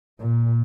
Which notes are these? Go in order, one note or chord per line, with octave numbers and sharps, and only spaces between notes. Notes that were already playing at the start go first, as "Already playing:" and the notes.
A#2